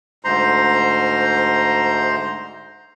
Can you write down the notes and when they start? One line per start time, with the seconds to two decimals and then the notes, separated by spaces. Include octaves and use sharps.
0.25 D2 G#2 C5 A#5 C6